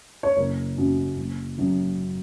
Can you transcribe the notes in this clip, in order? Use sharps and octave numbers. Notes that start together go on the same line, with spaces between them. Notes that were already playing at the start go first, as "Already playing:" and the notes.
C#5
F#1 A#4
F#2 F#3
F#1
F#2 F#3